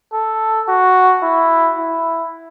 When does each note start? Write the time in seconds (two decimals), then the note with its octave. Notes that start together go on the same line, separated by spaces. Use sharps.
0.13 A4
0.69 F#4
1.23 E4
1.78 E4